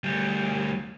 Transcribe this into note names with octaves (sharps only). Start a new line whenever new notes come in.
D2 G3